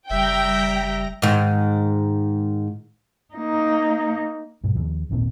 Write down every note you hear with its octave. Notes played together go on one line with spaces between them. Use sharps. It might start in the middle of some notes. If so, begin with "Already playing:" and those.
F#1 G3 E5 G5 A#5 A#6
G#2 D#3
A#3 D#4
G2 B2
D#2 F3
G#1 D#2 A#2 C4